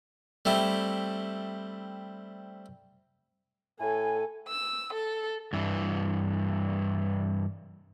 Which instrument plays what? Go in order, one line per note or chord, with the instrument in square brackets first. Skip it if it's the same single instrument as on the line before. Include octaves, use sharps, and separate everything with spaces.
[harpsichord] G3 A3 C4 E4
[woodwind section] A2 G#5 [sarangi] A4
[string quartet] E6
A4
[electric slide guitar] G2 E3